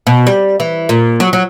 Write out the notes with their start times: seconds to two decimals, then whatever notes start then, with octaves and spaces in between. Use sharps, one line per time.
0.07 B2
0.27 G3
0.60 E3
0.89 A#2
1.20 F#3
1.33 F#3